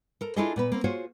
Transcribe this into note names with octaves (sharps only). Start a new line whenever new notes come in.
A4 A#4
D4 E4 F4 G#4 A4 D#5
A#2 B3 B4
A#3 C4
F4 F#4 G#4 C5 C#5